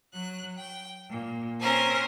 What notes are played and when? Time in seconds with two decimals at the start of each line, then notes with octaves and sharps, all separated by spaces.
0.14 F#3 F#6
0.57 G5
1.08 A#2
1.60 C4 C#4 A#4 C5